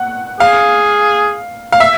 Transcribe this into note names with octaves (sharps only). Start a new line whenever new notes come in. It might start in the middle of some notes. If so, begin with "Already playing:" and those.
Already playing: F#5
G#4 F5
F5
E5